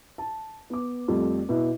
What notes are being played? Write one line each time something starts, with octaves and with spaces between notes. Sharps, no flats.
A5
B3 D6
F2 G3 A3
B2 E4